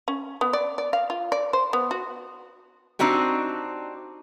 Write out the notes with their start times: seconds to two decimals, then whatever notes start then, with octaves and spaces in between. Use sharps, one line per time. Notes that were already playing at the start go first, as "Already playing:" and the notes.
0.08 C#4
0.41 B3
0.53 D5
0.78 D5
0.93 F5
1.10 F4
1.32 D5
1.53 C5
1.73 B3
1.91 F#4
2.99 C4 D4 D#4 F#4 G4